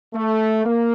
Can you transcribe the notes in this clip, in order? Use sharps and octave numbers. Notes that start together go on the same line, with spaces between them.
A3
A#3